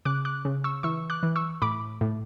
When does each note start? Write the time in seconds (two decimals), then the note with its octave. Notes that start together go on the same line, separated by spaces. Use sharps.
0.05 C#3 D6 F#6
0.25 D6 F#6
0.45 C#3
0.64 C#6 E6
0.83 E3 C#6 E6
1.10 D6 F#6
1.23 E3
1.36 C#6 E6
1.62 A2 B5 D6
2.01 A2